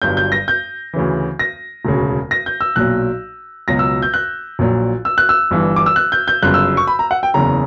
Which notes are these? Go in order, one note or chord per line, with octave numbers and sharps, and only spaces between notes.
G1 G2 F#3 G6
G6
A#6
G6
D2 C#3 E3
A#6
E1 D2 C#3
A#6
G6
E6
B1 A#2 F#3 F#6
C#2 B2 F#3 A#6
E6
G6
F#6
A#1 A#2 F#3
E6
F#6
E6
G1 G2 E3
D6
E6
F#6
G6
G6
G1 F#2 C#3 F#6
E6
C#6
B5
A#5
F#5
G5
F#1 E2 C#3 A#5